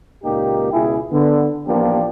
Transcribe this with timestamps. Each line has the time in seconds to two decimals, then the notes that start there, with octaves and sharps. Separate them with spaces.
0.24 C#2 A#2 A#3 D#4 G4
0.73 C#2 B2 E4 G#4
1.12 D3 B3
1.67 A1 F3 A#3 B3 D4 G4